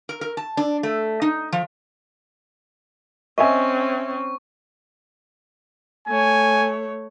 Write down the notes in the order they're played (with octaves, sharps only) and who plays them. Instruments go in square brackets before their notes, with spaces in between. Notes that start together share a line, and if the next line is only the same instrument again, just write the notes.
[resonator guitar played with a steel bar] A#4
A#4
A5
D4
A3
D#4
F3
[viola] C4 C#4 [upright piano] D#5 E5 G#5 [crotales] C#6
[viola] A3 C#5 [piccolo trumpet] G#5